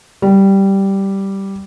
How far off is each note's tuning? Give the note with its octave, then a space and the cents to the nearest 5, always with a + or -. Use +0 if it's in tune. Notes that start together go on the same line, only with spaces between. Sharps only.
G3 -5